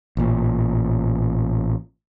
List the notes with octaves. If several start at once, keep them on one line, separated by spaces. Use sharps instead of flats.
A1 A#2